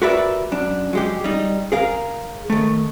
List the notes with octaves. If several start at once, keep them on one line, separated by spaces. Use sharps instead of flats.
F#4 G4 A#4 B4 D5 E5
F#2 D4
F#3 G#3 G4
G3 D#4
G#4 A#4 F5
D#3 A3